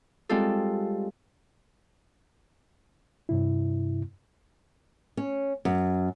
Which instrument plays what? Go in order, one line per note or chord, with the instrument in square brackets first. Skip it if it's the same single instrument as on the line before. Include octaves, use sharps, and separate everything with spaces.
[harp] G3 G#3 C4 F4 A4
[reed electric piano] G2 C3 E4
[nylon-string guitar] C#4
F#2